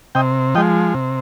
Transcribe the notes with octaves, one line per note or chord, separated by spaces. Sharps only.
C3 D#5 G5
F3 G#3 D#5 G5
C3